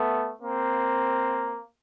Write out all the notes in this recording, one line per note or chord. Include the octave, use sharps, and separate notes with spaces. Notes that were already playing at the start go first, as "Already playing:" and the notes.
Already playing: A3 B3
A#3 C4